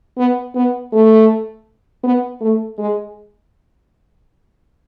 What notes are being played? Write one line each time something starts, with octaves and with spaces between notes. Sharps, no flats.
B3
B3
A3
B3
A3
G#3